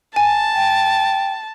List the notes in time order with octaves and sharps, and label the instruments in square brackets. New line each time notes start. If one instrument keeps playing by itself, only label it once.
[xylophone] G#5 [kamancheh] A5
[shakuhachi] G5